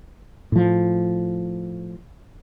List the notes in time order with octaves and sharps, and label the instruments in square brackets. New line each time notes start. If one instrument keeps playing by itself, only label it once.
[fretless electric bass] A2 F3